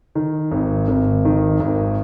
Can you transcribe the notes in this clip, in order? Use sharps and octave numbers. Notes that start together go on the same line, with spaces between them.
D#3
G#1
G#1
D#3
G#1